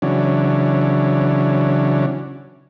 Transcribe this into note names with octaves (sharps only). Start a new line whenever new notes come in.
C#3 E3 F#3 C#4 D4